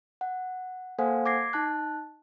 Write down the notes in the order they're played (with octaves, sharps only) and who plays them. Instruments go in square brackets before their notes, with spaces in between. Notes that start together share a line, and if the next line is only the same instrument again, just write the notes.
[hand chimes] F#5
A#3 A4 C5 F5 F#5 G#5
D6 G#6 A#6 C7
D#4 A5 F#6